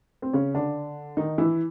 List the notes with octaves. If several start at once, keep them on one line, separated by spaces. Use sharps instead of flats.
C4
C#3 C#4
D3 D4
D#3 D#4
E3 E4